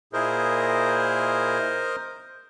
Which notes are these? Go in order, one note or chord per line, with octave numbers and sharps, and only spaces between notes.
A#2 E4 G#4 A#4 C5 D#5